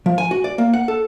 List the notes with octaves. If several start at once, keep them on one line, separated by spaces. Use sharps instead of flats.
F3
G#5
F#4
D5
A#3
F#5
A4